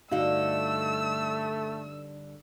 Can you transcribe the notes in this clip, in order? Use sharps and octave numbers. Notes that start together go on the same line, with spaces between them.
G2 D3 A3 D#4 F#4 F5 E6